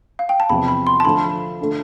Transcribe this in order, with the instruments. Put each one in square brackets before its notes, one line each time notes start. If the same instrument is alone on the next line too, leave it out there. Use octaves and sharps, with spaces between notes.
[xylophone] F5
G5
A5
[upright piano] E2 C3 F3 [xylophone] B5
[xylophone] B5
C6
A5
[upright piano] D3 F3 A3 [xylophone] B5
[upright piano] D3 A3